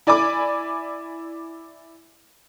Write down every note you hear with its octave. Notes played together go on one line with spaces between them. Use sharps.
E4 D5 G#5 B5 D6